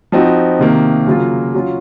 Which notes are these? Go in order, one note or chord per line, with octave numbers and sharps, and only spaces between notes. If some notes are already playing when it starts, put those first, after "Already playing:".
F3 C4 D#4 F#4
C3 D#3 A#3
C#3 F#3 A#3 F4
F#3 C#4 F4